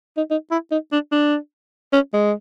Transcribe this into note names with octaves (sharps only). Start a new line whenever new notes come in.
D#4
D#4
E4
D#4
D4
D4
C#4
G#3